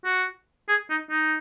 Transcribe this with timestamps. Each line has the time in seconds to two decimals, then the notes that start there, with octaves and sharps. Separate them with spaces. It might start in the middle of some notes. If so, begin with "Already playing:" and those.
0.05 F#4
0.69 G#4
0.90 D#4
1.11 D#4